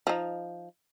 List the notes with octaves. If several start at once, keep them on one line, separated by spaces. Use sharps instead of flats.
F3 D#4